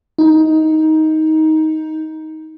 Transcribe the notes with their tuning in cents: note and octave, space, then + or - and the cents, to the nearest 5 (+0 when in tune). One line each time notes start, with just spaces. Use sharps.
D#4 +15